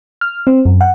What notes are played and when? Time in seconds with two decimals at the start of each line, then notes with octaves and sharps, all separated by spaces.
0.21 F6
0.47 C4
0.66 F#2
0.81 F#5